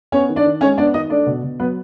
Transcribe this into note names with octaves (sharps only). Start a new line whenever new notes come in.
B3 C#4 C#5
D#3
D4 D5
D#3
G#3 C#4 C#5
B3 D4 D5
D#3 D#4 D#5
A3 D4 D5
B2
B2
F#3 B3 B4